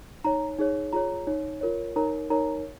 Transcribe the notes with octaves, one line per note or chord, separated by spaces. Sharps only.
D#4 C#5 A#5
D#4 G#4 C#5
F4 G#4 C#5 A#5
D#4 C#5
F4 A#4 C#5
D#4 A#4 C#5 A#5
D#4 A#4 C#5 A#5